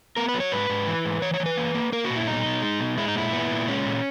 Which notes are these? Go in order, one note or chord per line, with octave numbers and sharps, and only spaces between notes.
B3 A#4
B4
F#3
C#5
G#2 B4
G#2
E3
G#2
E3 C#5
C#5
E3
B4
A#3
A#3
A#3 A#4
F#4
A#2
E4
B2 D#4
B2
G#3
B2
G#3 E4
D#4
A#2 E4
B3
A#2
G#3 C#4
A#2